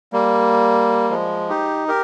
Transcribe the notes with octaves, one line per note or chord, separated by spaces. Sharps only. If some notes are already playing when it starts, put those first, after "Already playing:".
G3 A#3
F3 G#3
D#4 G4
G4 A#4